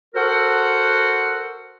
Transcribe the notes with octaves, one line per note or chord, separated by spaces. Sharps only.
F#4 A4 A#4 C5 F#5